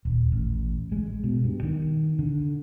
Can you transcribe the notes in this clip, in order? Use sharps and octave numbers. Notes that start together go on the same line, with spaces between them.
D#1
A1
G#3
B2
G2
D#3
D3